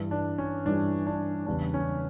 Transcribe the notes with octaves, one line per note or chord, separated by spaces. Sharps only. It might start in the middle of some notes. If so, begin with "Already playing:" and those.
Already playing: G2 E3 G3
D4
C#4
G2 E3 G3 D4
D4
E2 C#3 G3 D4
C#4